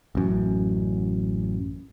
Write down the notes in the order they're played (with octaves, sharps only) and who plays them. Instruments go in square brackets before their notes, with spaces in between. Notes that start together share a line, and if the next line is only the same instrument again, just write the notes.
[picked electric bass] A1 F#2